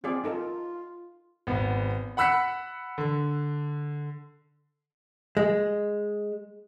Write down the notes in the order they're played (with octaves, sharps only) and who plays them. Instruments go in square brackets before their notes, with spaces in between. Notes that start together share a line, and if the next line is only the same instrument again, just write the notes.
[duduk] C4 [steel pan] F4 G#4 D5
[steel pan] D#4 A4 A#4 [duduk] F4
[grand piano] G#1 B3
F#5 B5 E6 F#6 B6 C#7
D3
[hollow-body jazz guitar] G#3